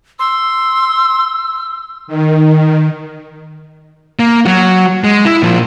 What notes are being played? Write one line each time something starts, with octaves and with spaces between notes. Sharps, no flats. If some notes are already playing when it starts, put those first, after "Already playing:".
C6 E6
D#3
A#3
F#3 F#4
G#3
E4
A#2 F3